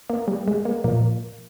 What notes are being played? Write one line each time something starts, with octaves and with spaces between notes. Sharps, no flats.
A#3
G3
G#3
A#3
A#2 F3 A#3